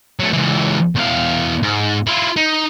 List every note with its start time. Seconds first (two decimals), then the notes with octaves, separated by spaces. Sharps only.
0.20 F#3 A3
0.33 C#2 E3
0.96 E2 F5
1.63 G#2
2.07 E4 F4
2.36 D#4